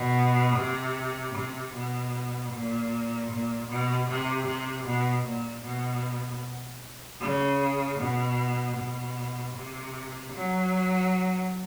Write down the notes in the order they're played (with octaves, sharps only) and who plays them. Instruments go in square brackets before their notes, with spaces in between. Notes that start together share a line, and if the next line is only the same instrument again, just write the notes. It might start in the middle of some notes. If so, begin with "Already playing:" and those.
Already playing: [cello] B2
C3
C3
B2
A#2
A#2
B2
C3
C3
B2
A#2
B2
C#3
B2
B2
C3
F#3